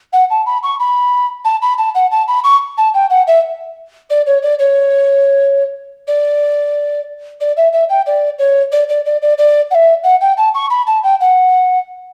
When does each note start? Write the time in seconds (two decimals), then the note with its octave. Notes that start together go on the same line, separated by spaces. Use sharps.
0.12 F#5
0.30 A5
0.46 B5
0.63 C#6
0.79 B5
1.44 A5
1.62 B5
1.78 A5
1.94 F#5
2.11 A5
2.28 B5
2.44 C#6
2.77 A5
2.94 G5
3.10 F#5
3.27 E5
4.09 D5
4.26 C#5
4.42 D5
4.59 C#5
6.07 D5
7.40 D5
7.56 E5
7.72 E5
7.89 G5
8.06 D5
8.38 C#5
8.71 D5
8.88 D5
9.05 D5
9.21 D5
9.37 D5
9.70 F#5
9.74 E5
10.03 F#5
10.21 G5
10.37 A5
10.54 C#6
10.70 B5
10.86 A5
11.03 G5
11.20 F#5